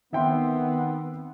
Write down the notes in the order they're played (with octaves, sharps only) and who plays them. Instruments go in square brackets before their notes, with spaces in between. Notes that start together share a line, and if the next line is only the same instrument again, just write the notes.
[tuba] D#3 [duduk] B3 [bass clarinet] C4 [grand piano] E5 G5 C6